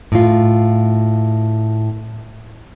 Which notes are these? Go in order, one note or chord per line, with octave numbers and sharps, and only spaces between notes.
A2 F4